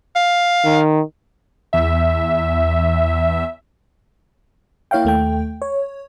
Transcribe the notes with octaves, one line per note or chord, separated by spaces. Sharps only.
F5
D#3
E2 E5
A#3 E4 C#5 F5 G5
D#2 A3 G5
C#5